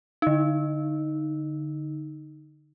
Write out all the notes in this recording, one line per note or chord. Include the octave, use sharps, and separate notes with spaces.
D3 D#4